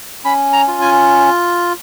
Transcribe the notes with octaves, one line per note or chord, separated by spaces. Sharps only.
C#4 B5
A#5
F4
G#5